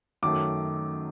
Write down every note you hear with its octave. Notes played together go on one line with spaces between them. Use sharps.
F#2 D#3 F#3 A3 D6